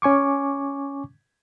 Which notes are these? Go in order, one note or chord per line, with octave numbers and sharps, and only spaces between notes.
C#4 G#5 C#6 D6